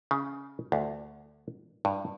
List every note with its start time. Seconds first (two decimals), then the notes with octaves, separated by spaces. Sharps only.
0.11 C#3
0.72 D2
1.85 G2